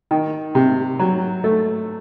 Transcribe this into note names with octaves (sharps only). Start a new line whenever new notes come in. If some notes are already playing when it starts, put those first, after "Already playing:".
D#3
C3
F#3
A3